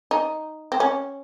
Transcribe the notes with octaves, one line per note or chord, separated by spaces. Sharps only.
D#4
C4
C#4